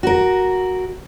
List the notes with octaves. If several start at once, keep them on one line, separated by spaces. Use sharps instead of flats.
F#4 A#4